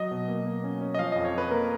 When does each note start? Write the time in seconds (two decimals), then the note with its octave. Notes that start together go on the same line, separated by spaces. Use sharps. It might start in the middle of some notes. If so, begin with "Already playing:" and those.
Already playing: F#3 D#5
0.11 B2
0.28 A#3
0.46 A#3
0.64 C#4
0.81 C#4
0.95 D#5
0.99 F3 F5
1.12 F2 D#5
1.25 C#5
1.34 F3 B4
1.51 A#3 A#4